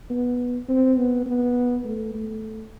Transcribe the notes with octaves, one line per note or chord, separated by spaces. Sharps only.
B3
C4
B3
B3
A3
A3